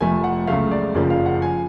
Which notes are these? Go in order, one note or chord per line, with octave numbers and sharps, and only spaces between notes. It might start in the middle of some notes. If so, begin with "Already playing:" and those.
F1 F2 F3 A3 G#5
F#5
C#2 C#3 F#3 A3 F5
D5
F#1 F2 C#3 F3 D5
F5
F#5
F3 G#5